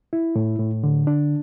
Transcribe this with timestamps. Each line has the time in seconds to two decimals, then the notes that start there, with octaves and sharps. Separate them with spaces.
0.13 E4
0.36 A2
0.59 A2
0.83 D3
1.07 D4